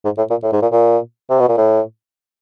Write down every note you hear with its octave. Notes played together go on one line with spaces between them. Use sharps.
G#2
A2
A#2
A2
G#2
A#2
A#2
C3
B2
A#2
A2